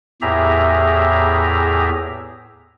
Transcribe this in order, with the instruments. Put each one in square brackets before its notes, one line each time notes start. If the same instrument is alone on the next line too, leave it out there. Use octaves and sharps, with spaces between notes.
[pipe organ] E2 A2 G4 G#4 E5 A#5